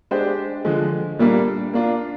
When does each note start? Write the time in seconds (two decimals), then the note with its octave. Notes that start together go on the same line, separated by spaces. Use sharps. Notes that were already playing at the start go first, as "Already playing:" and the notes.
0.11 G#3 D4 G4 C5
0.65 D3 F3 G#3
1.19 A#2 G3 A#3 D4
1.73 A#3 D4 F4